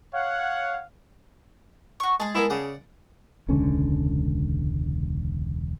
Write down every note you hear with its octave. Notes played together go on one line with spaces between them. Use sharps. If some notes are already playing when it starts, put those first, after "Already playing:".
C#5 F5 F#5
F#4 C#6
G#3 G#4 A5
G#3 B3 E4 A#4
C#3 D5 F#5
E1 C#2 D3 C#4